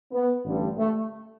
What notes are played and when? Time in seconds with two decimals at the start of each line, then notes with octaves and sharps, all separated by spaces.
0.12 B3
0.44 A1 G2 D3 G3
0.78 A3